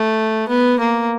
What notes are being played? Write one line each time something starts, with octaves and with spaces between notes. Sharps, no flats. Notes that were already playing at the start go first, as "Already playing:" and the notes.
Already playing: A3
B3
A#3